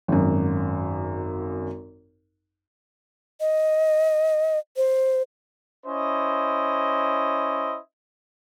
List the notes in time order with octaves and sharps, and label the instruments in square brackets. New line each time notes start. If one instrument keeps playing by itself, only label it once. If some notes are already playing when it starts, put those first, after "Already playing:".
[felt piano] G#1 F#2
[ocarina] D#5
C5
[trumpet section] C#4 E4 C5 D#5